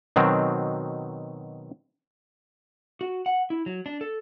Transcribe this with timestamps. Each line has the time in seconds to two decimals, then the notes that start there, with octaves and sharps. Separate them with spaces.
0.16 B2 D#3 F#3 C4
3.01 F#4
3.26 F#5
3.50 E4
3.66 F#3
3.86 D4
4.01 A4